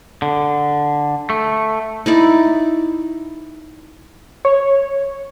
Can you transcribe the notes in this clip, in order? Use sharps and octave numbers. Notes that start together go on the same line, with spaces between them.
D3
A3
D#4 E4 D5
C#5